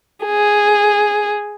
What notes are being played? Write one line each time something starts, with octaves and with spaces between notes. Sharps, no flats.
G#4